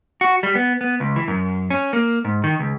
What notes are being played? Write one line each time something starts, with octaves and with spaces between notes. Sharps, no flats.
F#4
G3
B3
B3
C#2
E3
F#2
C#4
A#3
G#2
D#3
C#2